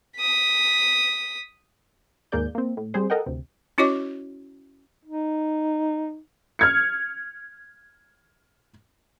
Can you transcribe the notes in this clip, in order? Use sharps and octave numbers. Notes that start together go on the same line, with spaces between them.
D#6 B6
D#2 G#2 A#3 G#4 D5 G6
A#3 C4
A2
G3 C4 G#4 C5
A4 A#4 D#5 F#5 G5
D2 C3
C#4 E4 F#4 C#5 D#5 D6
D#4
F6 G#6 C#7